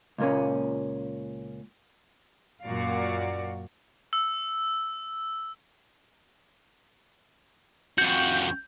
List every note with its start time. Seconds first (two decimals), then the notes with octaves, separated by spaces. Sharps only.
0.18 C#2 A#2 A#3 C#4
2.63 F#2 A#2 F#4 D5 F5
4.13 E6
7.98 F2 F#4 G6